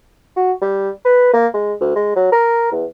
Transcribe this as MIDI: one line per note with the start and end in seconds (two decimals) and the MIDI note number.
0.36 0.52 66
0.62 0.90 55
1.05 1.31 71
1.33 1.47 58
1.54 1.74 56
1.80 1.94 38
1.96 2.14 56
2.16 2.27 54
2.32 2.70 70
2.72 2.85 40